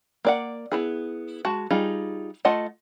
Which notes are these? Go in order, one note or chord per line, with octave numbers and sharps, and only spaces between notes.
A#3 D5 F#5
B3 E4 G#4
G#3 F#4 A5
G3 D#4 F4 G#4
A3 F4 D#5 F#5 A5